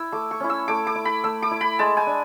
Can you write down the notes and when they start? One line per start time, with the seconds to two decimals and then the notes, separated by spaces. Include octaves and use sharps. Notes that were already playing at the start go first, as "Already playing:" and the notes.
Already playing: E4 E6
0.12 A3 D6
0.31 C#6
0.40 C#4 E4
0.50 E6
0.68 A3 D6
0.87 D6
0.95 E4
1.05 B5
1.24 A3 E6
1.42 D6
1.51 E4
1.61 B5
1.79 G#3 A5
1.97 G#5
2.07 D4